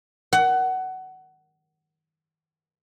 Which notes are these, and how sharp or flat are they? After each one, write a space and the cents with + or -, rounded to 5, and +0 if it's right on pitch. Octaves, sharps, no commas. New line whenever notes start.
F#5 +20